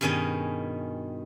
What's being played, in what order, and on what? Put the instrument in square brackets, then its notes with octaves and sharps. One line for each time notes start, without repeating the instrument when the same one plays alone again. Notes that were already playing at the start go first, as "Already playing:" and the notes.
[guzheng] G2 B2 D#3 C#4 G#4 D#5